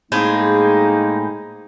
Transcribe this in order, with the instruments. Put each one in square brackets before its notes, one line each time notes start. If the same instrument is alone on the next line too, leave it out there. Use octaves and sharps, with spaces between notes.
[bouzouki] A2 C4 G#4 [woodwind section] G#3 A#3 D#4